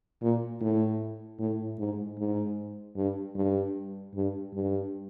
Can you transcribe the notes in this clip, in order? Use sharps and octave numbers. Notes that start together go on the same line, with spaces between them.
A#2
A2
A2
G#2
G#2
G2
G2
G2
G2